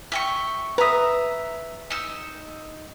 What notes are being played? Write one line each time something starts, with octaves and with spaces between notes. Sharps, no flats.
E5 G5 C#6
B4 E5 A#5 D#6
D#4 E6